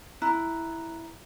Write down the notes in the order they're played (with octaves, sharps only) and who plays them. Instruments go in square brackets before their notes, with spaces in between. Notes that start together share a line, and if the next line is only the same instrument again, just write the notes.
[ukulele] E4 [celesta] A#5 F#6